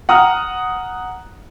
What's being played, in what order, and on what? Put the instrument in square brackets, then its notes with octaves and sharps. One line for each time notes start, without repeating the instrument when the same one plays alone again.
[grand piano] F#5 A#5 D#6 F6